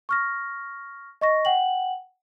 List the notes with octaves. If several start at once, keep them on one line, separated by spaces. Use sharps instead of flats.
C#6 F6 A#6
D#5 C#6 A#6
F#5 G5 F#7